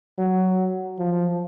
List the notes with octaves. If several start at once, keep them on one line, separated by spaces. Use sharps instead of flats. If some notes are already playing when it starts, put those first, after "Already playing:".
F#3
F3